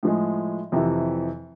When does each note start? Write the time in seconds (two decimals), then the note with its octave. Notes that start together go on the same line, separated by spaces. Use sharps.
0.03 A2 F3 G#3
0.72 F2 C3 E3